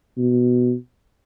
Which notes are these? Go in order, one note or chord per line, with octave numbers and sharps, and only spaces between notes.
B2